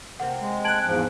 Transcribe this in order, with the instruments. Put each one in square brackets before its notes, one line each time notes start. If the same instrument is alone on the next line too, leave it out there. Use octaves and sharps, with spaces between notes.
[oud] C3 A#3 C4 [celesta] F#5
[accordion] G#3
[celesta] A5 G#6 F#7 [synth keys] F#6 D7
[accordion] E2 G#2 F3